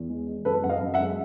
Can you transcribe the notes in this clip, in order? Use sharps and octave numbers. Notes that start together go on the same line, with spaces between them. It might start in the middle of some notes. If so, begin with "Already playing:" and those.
Already playing: E2
G#3
G#3
F#2 A4 B4
F#2 F#5
D#5 F5
F#2
E5 F#5
G#3